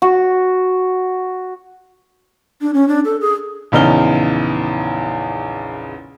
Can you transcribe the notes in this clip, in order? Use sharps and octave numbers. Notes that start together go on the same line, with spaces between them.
F#4
D4
C#4
D4
A4
G#4
A#1 E2 C#3 D#4 F6 G7